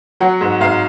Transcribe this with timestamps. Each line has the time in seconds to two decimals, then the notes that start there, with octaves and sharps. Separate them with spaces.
0.20 F#3 F#5
0.41 G#2
0.60 G#2 F5